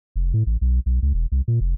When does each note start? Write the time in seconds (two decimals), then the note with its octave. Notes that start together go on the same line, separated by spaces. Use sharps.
0.16 F1
0.34 A2
0.46 A1
0.61 B1
0.86 B1
1.02 C#2
1.14 E1
1.32 C2
1.48 A#2
1.61 F1